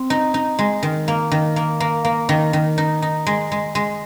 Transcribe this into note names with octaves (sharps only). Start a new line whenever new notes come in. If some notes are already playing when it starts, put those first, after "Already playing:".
Already playing: C4
D#4
D#4
G#3
D#3
A#3
D#3
A#3
A#3
A#3
D#3
D#3
D#4
D#4
G#3
G#3
G#3